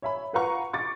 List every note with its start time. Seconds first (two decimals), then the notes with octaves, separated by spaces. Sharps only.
0.02 C#5 E5 B5
0.33 F4 B4 F5 F#5 A#5 C#6
0.73 C#6 D6 A6